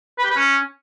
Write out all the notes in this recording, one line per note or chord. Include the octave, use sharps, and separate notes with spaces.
B4
G4
B4
C#4